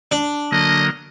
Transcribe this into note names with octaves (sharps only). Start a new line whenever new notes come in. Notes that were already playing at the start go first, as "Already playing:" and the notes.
D4
D3 F#3 A#3 D#5